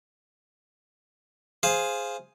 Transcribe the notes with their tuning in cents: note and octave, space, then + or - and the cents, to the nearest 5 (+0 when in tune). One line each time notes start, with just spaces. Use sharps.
G#4 +0 C5 +0 F5 +0